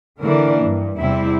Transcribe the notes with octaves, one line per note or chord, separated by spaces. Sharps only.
D3 E3 A#3 D4 A#4 D5
G2
E2 C3 G3 C4 E4